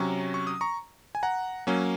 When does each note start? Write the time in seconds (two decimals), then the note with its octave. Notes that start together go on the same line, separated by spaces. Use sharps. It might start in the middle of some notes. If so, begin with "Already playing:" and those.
Already playing: C3 F#3 C#4 A#5 C#6
0.34 C#6
0.47 D#6
0.61 A#5 C#6
1.15 G#5
1.23 F#5 A#5
1.67 F#3 A#3 C#4